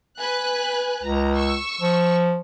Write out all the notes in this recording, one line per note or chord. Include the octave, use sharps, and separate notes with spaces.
B4 G#5 F#6
C#2 A#5
C#6 E6
F3